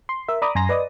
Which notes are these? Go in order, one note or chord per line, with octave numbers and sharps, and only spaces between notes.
C6
A#4 E5
D5 A#5 B5 D6 D#6
F#2 G#5 A#5 C6 A#6
B4 D5 D#5 D#6